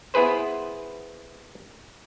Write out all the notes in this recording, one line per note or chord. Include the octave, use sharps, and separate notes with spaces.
B3 E4 G#4 B4 C5